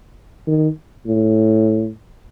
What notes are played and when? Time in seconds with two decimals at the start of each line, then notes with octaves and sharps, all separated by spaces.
0.47 D#3
1.06 A2